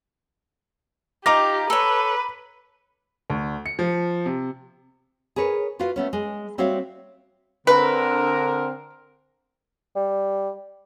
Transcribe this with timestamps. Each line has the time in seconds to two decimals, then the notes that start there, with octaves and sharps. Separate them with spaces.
1.26 D#4 F4 G4 F5 A#5 D6 A#6
1.70 A4 B4 C#5
3.30 D2
3.66 C#7
3.79 F3
4.26 C3
5.36 G#4 A#4 B4 C#5
5.79 F4 F#4 B4 F5
5.96 A3 B3 C#4
6.13 G#3
6.58 G3 C4 F#4 C#5 E5 F5
7.67 D3 C4 A#4 B4
9.96 G3